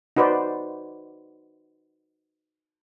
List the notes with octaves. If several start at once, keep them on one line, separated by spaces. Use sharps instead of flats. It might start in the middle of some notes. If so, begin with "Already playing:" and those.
D#4 F#4 B4 C5 D5